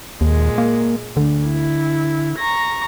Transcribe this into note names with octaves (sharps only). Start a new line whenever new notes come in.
D#2 A#2 G#3
A#3
D2 D3
E4
A#5 C#6 A#6